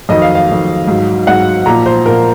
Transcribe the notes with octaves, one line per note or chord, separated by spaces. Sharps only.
F2 D#3 F#3 D#5
F5
F5
F2 D#3 F#3
G#2 F#3
G#2 F#3 F#5
A#2 F3 A#5
C5
A#2 F3 A#4